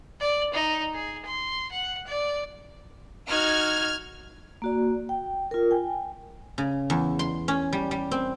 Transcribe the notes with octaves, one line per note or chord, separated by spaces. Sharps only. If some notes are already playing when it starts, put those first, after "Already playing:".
D5
D#4
G#4
C6
F#5
D5
D#4 F#4 F6 G#6
A#3 F#4 D5
G5
F4 A#4
G5 G#5
C#3
E2
C6
C#4
G3
G3
C4